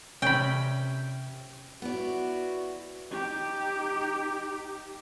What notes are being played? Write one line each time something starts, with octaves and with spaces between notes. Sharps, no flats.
C3 C#4 G5 B5
B3 E4 F#4 D5
D#4 G4